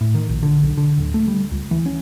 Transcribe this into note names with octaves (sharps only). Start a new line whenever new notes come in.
A2
D#3
A#1
D3
B1
D3
D1
A3
G3
C#2
E3
C#4